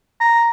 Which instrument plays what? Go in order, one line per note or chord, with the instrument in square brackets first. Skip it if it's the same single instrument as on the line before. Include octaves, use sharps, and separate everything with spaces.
[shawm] A#5